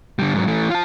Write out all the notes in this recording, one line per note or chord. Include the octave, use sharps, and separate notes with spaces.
D3 G3
G#2 F#3
E3 A3
F4 A5